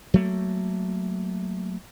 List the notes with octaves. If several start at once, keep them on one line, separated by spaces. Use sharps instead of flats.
F#3 A3 A#3